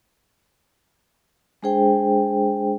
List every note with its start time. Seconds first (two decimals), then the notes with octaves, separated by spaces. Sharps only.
1.63 G#3 D4 G#4 C5 G5